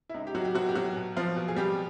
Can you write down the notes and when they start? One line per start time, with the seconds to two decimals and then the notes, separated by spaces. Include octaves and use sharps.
0.09 E4
0.14 C#2 D#4
0.27 G4
0.35 F#3 F#4
0.45 G4
0.55 B2 F#3 F#4
0.69 G4
0.75 F#3 F#4
0.96 B2
1.17 F3 F4
1.36 B2
1.48 G#4
1.56 G3 G4